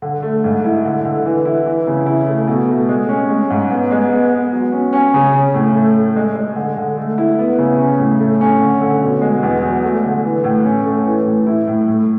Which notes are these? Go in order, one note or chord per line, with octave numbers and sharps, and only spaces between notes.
D3
A3
G#2
E4
D3
D3
E3
E4
E3
C#3
E4
A3
B2
A3
G#3
C#4
G#3
G#2
B3
G#3
B3
B3
F#3
C#4
C#4
C#3
C#4
A2
A3
A3
G#3
G#3
D3
D3
A3
E4
B3
C#3
C#4
A2
A3
C#4
D3
D3
B2
G#3
E2
F#3
A3
D3
E3
A2
C#4
A3
E3
A2
E4
A2
A2